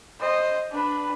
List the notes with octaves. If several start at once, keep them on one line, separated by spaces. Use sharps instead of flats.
C5 D#5
D4 B4